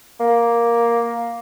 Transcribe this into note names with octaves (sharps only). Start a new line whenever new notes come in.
A#3